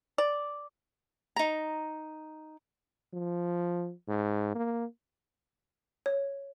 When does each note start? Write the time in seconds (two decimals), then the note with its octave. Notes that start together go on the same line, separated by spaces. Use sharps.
0.18 D5
1.36 D#4 A#5
3.14 F3
4.08 G#2
4.55 A#3
6.06 C#5